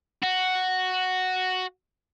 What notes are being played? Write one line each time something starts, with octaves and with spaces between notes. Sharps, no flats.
F#4